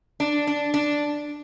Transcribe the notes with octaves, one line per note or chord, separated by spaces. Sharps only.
D4
D4
D4